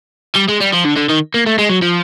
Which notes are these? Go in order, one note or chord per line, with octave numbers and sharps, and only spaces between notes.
G3
G#3
G3
F3
D3
D3
D#3
A#3
A3
G#3
F#3
F3